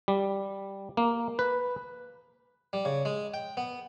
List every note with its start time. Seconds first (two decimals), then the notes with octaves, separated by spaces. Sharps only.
0.08 G3
0.97 A#3
1.39 B4
2.73 G3
2.85 C#3
3.05 G#3
3.34 G5
3.57 B3